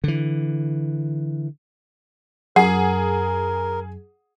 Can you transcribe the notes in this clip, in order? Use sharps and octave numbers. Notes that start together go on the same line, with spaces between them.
D3 E3
F#2 G#4 A#4 F#5